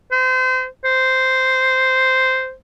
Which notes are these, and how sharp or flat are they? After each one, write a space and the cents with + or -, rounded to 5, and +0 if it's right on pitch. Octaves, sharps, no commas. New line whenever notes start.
C5 -30
C5 -5